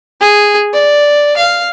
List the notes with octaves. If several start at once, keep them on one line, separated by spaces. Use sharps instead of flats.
G#4
D5
F5